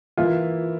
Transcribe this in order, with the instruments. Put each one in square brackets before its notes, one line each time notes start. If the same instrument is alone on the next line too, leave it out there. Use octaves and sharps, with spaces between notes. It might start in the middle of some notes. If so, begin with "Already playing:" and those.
[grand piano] E3 A#3 E4 [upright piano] F4